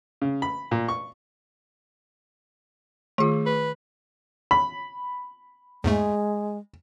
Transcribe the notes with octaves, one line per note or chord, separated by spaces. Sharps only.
C#3
B5
A#2
C#6
D#3 A3 F4 G#4
B4
B5
E2 G#2 G#3 A3